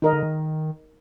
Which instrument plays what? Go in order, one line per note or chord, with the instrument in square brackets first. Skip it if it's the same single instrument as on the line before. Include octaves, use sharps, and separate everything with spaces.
[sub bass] D#3 [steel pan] D#4 A#4 D#5
[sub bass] D3
D#3